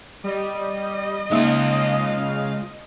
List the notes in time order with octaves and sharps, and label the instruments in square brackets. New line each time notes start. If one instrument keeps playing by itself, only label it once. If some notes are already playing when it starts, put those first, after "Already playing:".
[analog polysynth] G3 [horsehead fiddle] D#5
[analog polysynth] C#3 F5 [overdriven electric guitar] G#3 F4 [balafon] A#3 D#4